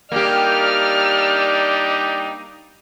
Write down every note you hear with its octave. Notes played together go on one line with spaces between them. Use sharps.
G3 A#3 D4 D#4 G4 D5 F6